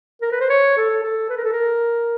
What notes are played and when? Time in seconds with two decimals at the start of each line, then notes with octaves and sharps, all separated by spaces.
0.21 A#4
0.32 B4
0.40 C5
0.50 C#5
0.77 A4
1.04 A4
1.29 B4
1.37 A#4
1.44 A4
1.52 A#4